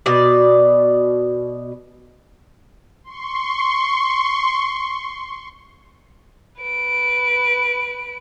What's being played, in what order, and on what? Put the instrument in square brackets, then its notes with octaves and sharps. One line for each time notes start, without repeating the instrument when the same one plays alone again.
[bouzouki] B2 D5
[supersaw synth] C6 C#6
[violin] B4 D7